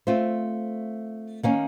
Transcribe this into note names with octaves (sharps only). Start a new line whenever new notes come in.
A3 C4 F4 C5
D#3 A#3 C#4